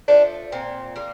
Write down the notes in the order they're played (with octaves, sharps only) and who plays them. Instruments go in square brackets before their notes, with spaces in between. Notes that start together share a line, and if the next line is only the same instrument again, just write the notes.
[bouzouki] F3 A3 D4
A#2 C4
G3 A#3